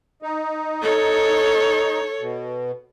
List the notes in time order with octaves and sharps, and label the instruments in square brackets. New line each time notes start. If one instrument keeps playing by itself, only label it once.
[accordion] D#4
[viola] A4 C#5
[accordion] B2